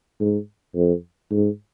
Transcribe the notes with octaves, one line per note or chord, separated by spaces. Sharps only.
G#2
F2
G#2